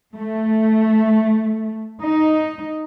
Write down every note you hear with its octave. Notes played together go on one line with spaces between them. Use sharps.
A3
D#4